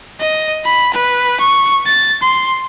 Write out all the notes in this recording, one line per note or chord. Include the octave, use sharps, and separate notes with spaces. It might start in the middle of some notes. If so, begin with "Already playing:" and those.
D#5
B5
B4
C#6
A6
C6